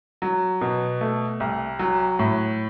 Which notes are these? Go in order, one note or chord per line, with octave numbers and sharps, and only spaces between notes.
F#3
B2
A3
C2
F#3
A2